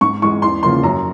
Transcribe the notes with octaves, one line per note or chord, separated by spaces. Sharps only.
G#2 C#6
E3 G#3 C#6
E2 C6
C#3 F3 A#3 C6
F#2 A#5